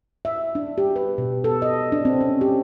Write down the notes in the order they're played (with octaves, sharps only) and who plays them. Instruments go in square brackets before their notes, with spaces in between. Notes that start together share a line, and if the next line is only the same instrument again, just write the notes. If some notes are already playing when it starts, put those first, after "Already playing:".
[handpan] E5
D4
G4
B4
B2
A4
D#5
D4
C4
C#4
G4